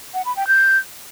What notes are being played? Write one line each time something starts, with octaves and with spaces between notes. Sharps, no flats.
F#5
B5
G5
G6